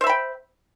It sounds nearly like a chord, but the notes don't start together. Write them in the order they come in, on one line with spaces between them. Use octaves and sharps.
C5 E5 B5 G5